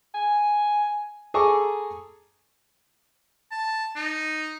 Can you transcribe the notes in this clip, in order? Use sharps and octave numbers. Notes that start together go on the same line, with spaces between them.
G#5
G#4 A4 G#5 A#5 C#6 D6
A5
D#4